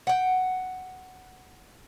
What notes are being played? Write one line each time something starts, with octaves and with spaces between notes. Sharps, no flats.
F#5 G5